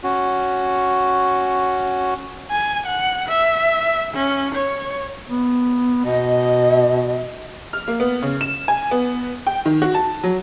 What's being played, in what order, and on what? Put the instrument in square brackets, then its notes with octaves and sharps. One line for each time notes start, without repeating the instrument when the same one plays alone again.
[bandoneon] C#4 F#4
[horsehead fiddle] G#5
F#5
E5
C#4
C#5
[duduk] B3
[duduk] B2 [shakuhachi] D#5
[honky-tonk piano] F6
A#3
B3
C#3
E7
G#5
B3
G5
D#3
F#4
A5
F#3